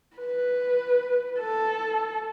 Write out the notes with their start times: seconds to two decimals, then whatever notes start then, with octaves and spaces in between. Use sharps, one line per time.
0.16 B4
1.39 A4